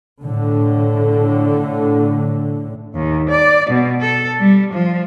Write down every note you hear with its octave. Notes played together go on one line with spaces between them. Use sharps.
A2 D3
D#2
D5
B2
A4
G3
F3